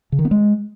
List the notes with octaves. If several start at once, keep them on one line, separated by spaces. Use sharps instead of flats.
C#3
D#3
B3
G#3